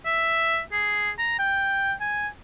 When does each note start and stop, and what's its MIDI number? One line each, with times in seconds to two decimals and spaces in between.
0.06 0.60 76
0.73 1.11 68
1.19 1.38 82
1.39 1.93 79
2.01 2.28 80